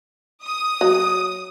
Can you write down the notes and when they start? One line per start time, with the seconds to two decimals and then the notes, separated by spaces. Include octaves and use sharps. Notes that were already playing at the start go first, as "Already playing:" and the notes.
0.44 D#6
0.81 F#3